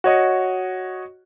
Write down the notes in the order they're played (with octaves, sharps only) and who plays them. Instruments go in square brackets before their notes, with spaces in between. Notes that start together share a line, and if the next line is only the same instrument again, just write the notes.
[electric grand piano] F#4 C#5 D#5 C#6